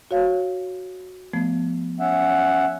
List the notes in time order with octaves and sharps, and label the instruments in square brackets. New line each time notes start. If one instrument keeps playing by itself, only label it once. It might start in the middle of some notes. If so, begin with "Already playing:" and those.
[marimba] F#4 C#5 F5
F3 A3 B3
[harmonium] C#4 E5 F#5